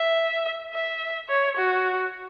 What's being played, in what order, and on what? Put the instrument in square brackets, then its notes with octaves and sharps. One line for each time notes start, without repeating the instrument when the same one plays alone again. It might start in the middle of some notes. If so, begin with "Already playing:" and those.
Already playing: [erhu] E5
E5
C#5
F#4